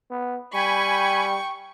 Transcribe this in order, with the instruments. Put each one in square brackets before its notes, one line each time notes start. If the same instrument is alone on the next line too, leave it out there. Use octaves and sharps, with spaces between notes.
[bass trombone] B3
[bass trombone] G3 [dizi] G5 [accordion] G#5 B5 [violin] C#6